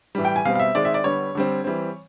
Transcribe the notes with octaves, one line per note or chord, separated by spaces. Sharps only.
A2 E3 G3
G5
G#5
B2 G3 C4 F5
F5
E5
D#3 G#3 C4 D5
E5
D5
D3 G3 B3 C#5
D3 G3 C4
E3 G3 C4